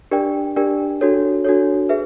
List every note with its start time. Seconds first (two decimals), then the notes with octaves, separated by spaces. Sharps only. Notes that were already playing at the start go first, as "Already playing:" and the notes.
0.11 D4 G4 A#4 D5 G5
0.56 D4 G4 A#4 D5 G5
1.01 D4 F#4 A4 C#5
1.45 D4 F#4 A4 C#5
1.89 G#4 B4 E5